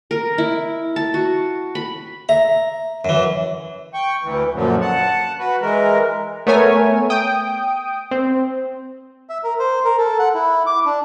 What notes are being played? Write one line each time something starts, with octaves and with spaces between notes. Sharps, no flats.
A#4
E4
A5
F#4
B5
E5 A#5
F#2 E3
G5 C#6
D2 E3
F#2 A#2 D3 F3 F#3
F#5 A5
F#4 B4
E3 G#3 A#4
A3 B3 A#4 C#5 E5 G#5
G5 D#6 D7
C4
E5
A#4
C5
A#4
A4
F#5
E4
D6
D4